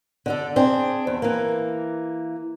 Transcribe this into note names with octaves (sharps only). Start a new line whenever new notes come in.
D3 D4 A4
C4 D4 G#4
E2
E3 A#3